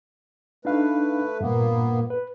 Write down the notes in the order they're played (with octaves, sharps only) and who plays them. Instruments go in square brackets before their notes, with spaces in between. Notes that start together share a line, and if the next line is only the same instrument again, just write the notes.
[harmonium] A3 B4 [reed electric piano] D4 D#4 F5
[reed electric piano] G2 A#2 [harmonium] A#3 B3
[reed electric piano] B4